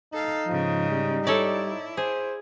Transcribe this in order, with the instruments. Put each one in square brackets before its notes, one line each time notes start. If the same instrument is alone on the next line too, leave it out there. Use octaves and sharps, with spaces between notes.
[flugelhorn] D#4 [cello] A4 F5
[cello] G#2 C#3 [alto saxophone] F3
[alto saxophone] G3
[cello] E4 [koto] A4 C#5 D5
[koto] G#4 [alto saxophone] C5